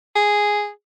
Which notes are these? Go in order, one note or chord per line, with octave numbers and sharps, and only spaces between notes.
G#4